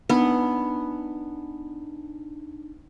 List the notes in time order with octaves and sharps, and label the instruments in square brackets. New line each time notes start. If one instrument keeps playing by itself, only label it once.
[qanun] B3 [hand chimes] D4 D#4